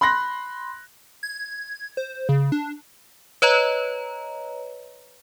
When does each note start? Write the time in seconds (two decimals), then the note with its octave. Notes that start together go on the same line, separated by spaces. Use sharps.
0.01 B5 C6 F#6 A#6
1.23 G#6
1.97 C5
2.29 C#3
2.52 D4
3.42 B4 C#5 D#5 A#5